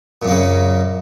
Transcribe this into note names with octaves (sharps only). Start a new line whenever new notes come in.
F#2 A#2 C#3 A#3